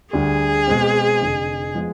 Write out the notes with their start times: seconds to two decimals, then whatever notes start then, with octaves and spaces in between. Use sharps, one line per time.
0.13 D2 D3 G3 G#4
0.67 B2 G#3 C4
1.21 F1 F2 D3
1.75 F3 G#3 B3